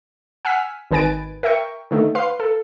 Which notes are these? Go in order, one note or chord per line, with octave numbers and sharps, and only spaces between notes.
F#5 G#5 E6 F6 B6
G#1 D#3 B4 G#5 A6 D7
A#4 E5 G5 C#6
D3 D#3 A3
B4 F5 C6 C7
A4